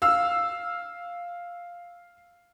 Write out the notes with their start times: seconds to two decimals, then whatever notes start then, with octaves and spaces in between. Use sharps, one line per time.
0.02 F5 E6